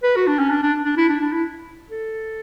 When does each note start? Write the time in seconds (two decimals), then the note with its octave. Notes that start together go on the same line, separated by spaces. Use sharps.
0.03 B4
0.16 F#4
0.27 D4
0.39 C#4
0.51 D4
0.63 D4
0.85 D4
0.97 E4
1.09 D4
1.21 D4
1.32 E4
1.90 A4